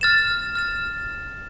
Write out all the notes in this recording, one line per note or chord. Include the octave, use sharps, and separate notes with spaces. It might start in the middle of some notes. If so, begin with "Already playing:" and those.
F6 A6 E7
F6 A6 E7